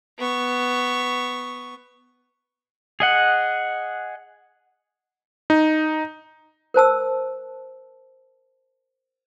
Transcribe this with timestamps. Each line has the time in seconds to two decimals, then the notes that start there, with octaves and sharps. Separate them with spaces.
0.19 B3 C#6
3.00 G#4 D#5 F#5
5.50 D#4
6.74 A#4 C5 A5 E6